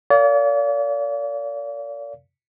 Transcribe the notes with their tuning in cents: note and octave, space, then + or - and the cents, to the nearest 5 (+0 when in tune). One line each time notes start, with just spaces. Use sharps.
A#4 -25 D5 -40 F5 +0